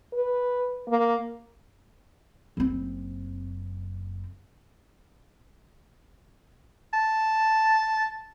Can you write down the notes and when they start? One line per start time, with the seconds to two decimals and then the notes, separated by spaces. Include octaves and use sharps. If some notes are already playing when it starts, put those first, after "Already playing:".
0.13 B4
0.88 A#3
2.57 F#1 C4
6.94 A5